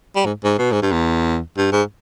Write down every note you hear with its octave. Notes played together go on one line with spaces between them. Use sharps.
G3
G#2
G#2
B2
G#2
G2
E2
G2
G#2